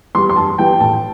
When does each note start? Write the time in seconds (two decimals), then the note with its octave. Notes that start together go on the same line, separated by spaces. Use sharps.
0.15 E3 G3 C6
0.29 C6
0.36 G2 A5
0.58 E3 G3 G5
0.80 A2 A5